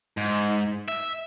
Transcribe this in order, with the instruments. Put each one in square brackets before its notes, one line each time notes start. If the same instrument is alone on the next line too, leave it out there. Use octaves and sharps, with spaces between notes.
[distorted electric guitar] G#2
E5